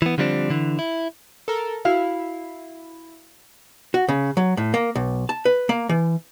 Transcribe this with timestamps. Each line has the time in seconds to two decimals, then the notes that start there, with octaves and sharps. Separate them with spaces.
0.02 E3 B3
0.18 D3 F3 G3 C4 D4
0.50 D3 E3
0.79 E4
1.48 A4 A#4
1.85 E4 F#4 F5
3.94 F#4
4.08 C#3
4.37 F#3
4.57 A2
4.74 A#3
4.95 B1
5.29 A5
5.45 B4
5.69 A#3
5.89 E3